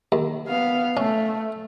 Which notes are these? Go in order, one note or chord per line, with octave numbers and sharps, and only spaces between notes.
D#2
B3 F5
A3 C#4